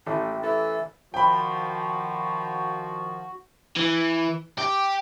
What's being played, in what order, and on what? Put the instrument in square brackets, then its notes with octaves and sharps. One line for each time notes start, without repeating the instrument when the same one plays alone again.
[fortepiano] A1 [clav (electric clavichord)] A3 [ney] G5
[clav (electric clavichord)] E3 [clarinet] A4 [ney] E5
[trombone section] D#3 F3 [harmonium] F#4 [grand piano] G5 B5
[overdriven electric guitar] E3
G4